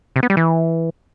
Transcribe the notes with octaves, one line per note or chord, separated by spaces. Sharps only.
C3
B3
G3
E3